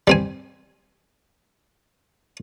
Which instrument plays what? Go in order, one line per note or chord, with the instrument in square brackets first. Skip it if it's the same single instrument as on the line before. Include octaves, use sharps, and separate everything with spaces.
[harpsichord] G3 C4 G#5